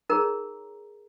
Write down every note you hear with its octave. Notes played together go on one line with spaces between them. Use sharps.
D#4 G#4 A#4 C#5 A#5